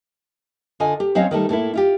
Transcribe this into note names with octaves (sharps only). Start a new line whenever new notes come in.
D3 F4 D#5 G#5
G4
F#3 C4 C#4 D#5 F5
D#3 G3 A3
A2 A3 A#3 E4
E4 F4 G4